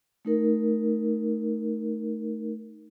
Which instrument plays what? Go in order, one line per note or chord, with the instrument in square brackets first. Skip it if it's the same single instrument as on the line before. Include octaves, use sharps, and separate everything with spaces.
[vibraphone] A3 D#4 A#4